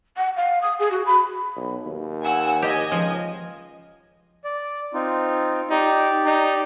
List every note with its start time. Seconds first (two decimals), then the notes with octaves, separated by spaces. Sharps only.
0.17 F#5
0.36 F5
0.62 D#6
0.79 G#4
0.91 F#4
1.06 B5
1.56 B1
1.86 D#2
2.23 F#5 G#5 E6
2.62 G4 D#5 G#5
2.92 C#2 F3
4.44 D5
4.94 C4 D#4 F4
5.70 D#4 G4 D5
6.26 D#4